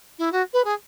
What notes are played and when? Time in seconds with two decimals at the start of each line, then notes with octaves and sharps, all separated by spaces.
0.19 E4
0.32 F#4
0.53 B4
0.65 G#4